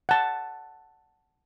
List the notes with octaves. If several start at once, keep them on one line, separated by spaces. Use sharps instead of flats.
F#5 A5